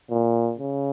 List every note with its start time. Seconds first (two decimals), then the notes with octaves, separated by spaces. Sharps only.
0.11 A#2
0.59 C#3